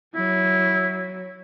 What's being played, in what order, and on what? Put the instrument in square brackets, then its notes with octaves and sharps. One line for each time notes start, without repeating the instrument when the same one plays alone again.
[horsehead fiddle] F#3 [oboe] E4